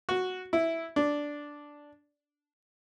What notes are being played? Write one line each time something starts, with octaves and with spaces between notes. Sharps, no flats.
F#4
E4
D4